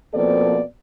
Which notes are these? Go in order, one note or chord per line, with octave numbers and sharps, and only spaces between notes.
B2 F3 A#3 C4 A4 D5